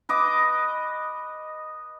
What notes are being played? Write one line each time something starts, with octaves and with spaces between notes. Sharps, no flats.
B4 D#5 D6